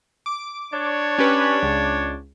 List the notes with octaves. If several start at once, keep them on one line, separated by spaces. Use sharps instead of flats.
D6
D4 C#5
C#4 G4 B4
C#2